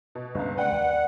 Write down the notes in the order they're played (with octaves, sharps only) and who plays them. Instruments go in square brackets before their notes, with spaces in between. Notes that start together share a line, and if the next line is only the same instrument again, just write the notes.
[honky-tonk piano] B2
[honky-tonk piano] G1 C#2 [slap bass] G2 [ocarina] B4
[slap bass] C3 G#3 [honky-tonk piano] B4 G5 [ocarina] D5 [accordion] F#5
[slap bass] D#2